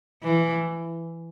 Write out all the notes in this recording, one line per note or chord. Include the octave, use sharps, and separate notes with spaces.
E3